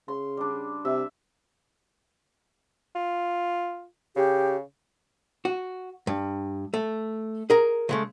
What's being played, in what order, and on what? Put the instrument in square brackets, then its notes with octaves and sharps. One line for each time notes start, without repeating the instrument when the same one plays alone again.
[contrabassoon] C#3 [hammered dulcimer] C6
[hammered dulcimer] G3 D4
[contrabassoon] C3 [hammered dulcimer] E5
[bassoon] F4
[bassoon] C#3 [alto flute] G4
[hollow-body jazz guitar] F#4
G2
A3
G#4 A#4 A#5
C#3 G#3 A3